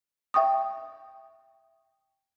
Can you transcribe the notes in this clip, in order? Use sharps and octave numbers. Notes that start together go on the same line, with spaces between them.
E5 G5 C#6 D#6